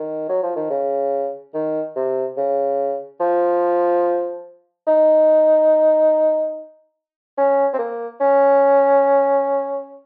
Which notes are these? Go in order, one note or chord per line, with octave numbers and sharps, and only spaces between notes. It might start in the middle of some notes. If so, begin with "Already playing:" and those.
Already playing: D#3
F#3
F3
D#3
C#3
D#3
C3
C#3
F3
D#4
C#4
C4
A#3
C#4